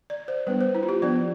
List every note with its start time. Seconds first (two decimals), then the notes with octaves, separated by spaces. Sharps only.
0.10 D5
0.28 C5
0.47 G3 B3 D4 B4
0.61 C5
0.75 E4
0.83 F4
0.89 G4
1.02 F3 B3 D4 D5